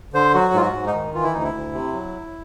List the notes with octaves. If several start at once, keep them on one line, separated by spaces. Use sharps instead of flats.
D3 C5
F#3 F#4
G#2 F4
F#4
G#2
D#4
D#3
E3 F4
E4
D2 D#4
E4
D2
C3
F#3